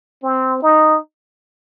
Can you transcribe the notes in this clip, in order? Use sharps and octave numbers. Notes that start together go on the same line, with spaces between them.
C4
D#4